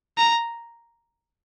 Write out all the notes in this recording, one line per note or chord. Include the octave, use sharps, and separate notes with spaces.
A#5